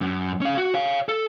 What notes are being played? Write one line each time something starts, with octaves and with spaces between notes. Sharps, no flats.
F#2
C#4 F5
F#4
C#5 F5
A4